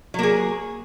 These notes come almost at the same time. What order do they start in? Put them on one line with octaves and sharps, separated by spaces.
F#3 A#3 G#4